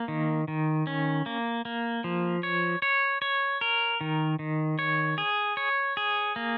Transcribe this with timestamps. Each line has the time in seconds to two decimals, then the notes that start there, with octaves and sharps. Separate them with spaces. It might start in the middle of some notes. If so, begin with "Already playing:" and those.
Already playing: A#3
0.08 D#3
0.48 D#3
0.87 C#4
1.26 A#3
1.65 A#3
2.04 F3
2.43 C#5
2.82 C#5
3.22 C#5
3.61 A#4
4.01 D#3
4.39 D#3
4.79 C#5
5.18 G#4
5.57 C#5
5.97 G#4
6.36 A#3